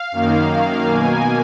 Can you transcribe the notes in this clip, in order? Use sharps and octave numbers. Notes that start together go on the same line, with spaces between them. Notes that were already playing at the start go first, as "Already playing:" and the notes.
Already playing: F5
F#2 D#3 A#3
B2 A#3 G#5